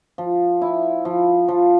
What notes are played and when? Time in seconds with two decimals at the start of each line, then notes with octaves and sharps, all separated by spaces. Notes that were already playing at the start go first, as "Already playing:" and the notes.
0.18 F3
0.62 E4
1.05 F3
1.48 F3